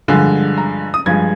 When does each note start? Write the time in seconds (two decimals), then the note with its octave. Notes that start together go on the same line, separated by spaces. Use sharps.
0.08 G2 D3 F3 G#3
0.58 A#5
0.94 D#6
1.06 G2 F3 G#3 G#6